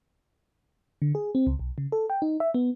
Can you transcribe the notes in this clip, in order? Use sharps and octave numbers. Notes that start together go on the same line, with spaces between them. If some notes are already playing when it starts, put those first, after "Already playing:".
D3
G#4
C4
C#2
B1
C#3
A4
G5
D#4
E5
B3